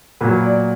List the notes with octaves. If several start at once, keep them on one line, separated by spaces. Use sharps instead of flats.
A#2 F#3 B4
D5